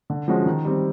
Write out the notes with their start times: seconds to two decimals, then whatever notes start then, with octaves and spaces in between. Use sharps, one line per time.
0.10 D3
0.28 F3 G#3 C#4 F#4
0.46 D#3
0.65 G3 C4